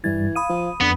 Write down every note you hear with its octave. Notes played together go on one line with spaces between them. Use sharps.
G2 E3 G3 G#6 A6
F5 B5 D#6 D#7
F3
F2 D3 B3